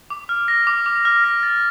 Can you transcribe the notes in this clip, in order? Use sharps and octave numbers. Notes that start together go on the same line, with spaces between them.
D6
F6
A#6
D6
D6
F6
A#6
A6